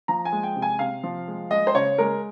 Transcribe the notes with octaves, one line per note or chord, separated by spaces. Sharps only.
F3 A#5
G#5
G#3
G5
C3
G#5
C3 F5
F3
G#3
G#3 D#5
C5
C#3 C#5
G#3 A#4